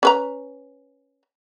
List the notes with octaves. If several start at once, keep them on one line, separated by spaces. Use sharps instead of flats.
C#4 B4 A#5